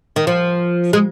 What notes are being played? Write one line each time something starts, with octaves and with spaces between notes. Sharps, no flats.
D#3
F3
G#3